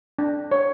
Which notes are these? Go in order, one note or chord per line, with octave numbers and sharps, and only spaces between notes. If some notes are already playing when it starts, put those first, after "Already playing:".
D4
C#5